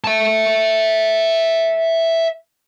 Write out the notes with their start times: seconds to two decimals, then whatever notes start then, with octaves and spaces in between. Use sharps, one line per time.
0.04 E5 A5